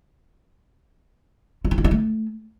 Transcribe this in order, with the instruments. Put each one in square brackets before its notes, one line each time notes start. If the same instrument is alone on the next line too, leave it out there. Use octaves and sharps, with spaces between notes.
[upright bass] F4
D#4
F4
E4
A3